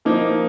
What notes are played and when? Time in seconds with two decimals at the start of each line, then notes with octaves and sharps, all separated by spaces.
0.05 F3 A#3 D#4